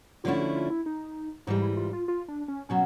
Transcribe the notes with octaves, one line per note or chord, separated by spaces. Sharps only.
D3 F3 A3 C#4 E4 F4
F#4
F4
E4
D#4
G#2 E3 G3 D#4
E4
F4
F4
F4
D4
C#4
B2 F#3 C#4